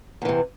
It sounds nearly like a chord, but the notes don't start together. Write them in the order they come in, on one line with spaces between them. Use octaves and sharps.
E2 E3 C3